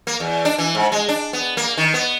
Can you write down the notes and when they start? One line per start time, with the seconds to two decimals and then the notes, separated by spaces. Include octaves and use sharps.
0.07 A#3
0.20 E2
0.45 D4
0.58 E3
0.75 G#2
0.92 G#3
1.08 D4
1.33 B3
1.57 A#3
1.77 D#3
1.94 B3